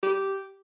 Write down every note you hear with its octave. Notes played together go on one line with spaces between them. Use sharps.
G4